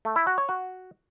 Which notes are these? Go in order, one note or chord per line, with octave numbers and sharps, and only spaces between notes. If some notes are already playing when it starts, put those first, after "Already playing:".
A3
E4
F#4
C#5
F#4